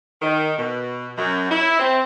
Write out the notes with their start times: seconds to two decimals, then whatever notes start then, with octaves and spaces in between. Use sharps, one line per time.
0.22 D#3
0.57 B2
1.18 F#2
1.50 E4
1.79 C4